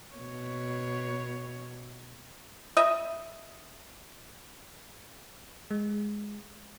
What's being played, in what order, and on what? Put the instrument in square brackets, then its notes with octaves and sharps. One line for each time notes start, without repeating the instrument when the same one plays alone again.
[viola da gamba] B2 C#5
[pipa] D#5 E5
[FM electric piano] G#3